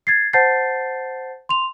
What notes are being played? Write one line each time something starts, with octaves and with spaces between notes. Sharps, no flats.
G#6 A6 C7
C5 F#5 A5 G6 A6 C7
C6 F7